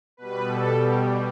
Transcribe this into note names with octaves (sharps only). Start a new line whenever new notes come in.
B2 G3 B4
A4
G4